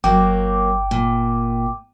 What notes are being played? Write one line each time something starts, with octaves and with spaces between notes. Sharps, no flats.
G1 F#3 A#3 G5 D6
A#2